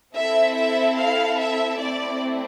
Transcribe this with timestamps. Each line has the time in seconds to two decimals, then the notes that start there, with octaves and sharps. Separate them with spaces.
0.14 C4 E4 A4 E5
0.56 E5
0.97 F5
1.39 E5
1.80 A3 C4 E4 D5